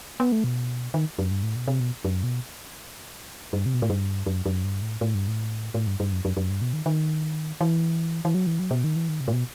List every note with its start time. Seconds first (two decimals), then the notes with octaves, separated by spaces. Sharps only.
0.20 B3
0.32 A3
0.44 B2
0.94 D#3
1.18 F#2
1.31 G2
1.43 A2
1.56 B2
1.67 C3
1.80 B2
2.04 F#2
2.23 B2
3.53 G2
3.66 C3
3.74 B2
3.82 A2
3.90 G2
4.26 F#2
4.45 F#2
4.64 G2
4.82 A2
5.01 A2
5.14 G2
5.28 A2
5.74 A2
5.87 G2
6.00 G2
6.12 F#2
6.25 F#2
6.37 F#2
6.50 G2
6.61 B2
6.73 D#3
6.86 D#3
7.61 E3
8.25 E3
8.34 F#3
8.47 E3
8.59 F#3
8.71 B2
8.84 D#3
8.96 E3
9.09 D#3
9.20 C3
9.28 A2
9.33 B2